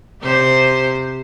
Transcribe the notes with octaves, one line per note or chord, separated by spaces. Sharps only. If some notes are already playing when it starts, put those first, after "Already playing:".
C3 G4 C5